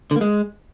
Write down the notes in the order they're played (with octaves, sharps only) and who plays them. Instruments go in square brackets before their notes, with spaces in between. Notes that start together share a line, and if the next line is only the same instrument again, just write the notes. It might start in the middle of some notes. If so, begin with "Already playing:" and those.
[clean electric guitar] D3
A#3
G#3